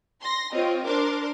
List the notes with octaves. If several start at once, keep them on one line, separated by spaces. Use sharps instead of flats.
C6 A#6
C4 F4 C#5 D#5
D4 A#4 C5 C6 D6